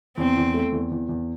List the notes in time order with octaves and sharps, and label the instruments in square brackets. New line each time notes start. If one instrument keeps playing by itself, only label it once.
[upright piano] E2 [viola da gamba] C4
[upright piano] E2
A3
E2
E2
E2